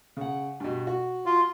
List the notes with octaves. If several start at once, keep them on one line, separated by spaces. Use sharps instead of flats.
C#3 F#5
G2 B2
F#4
F4